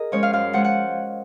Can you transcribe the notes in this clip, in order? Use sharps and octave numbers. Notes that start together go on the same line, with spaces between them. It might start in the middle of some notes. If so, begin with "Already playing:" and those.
Already playing: G#4 A#4 D#5
F3 G#3 C#4 C#5
F5
F#2 F5
F3 G#3 C#4 F#5
F#5